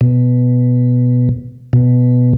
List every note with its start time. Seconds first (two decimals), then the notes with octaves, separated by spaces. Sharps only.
0.01 B2
1.73 B2